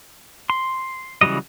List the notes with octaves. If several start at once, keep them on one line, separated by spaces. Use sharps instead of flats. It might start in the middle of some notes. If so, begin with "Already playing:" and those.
C6
C#3 E3 F#3 G3 D#5